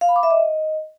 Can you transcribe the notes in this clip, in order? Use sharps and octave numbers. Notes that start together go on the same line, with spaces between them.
F5
B5
D6
E5
D#5